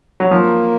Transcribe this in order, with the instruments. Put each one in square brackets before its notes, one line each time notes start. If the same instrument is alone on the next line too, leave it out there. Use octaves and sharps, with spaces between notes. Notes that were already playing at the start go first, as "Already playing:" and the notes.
[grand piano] F#3
[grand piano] F3 [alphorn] A#3